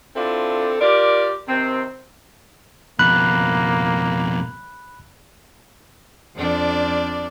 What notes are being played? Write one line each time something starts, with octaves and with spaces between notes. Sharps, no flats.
C4 D4 E4 F4 A4
F4 G4 A#4 D5
C3 D#3 C4
F2 B2 A#3 B5 F#6
F2 D4 D5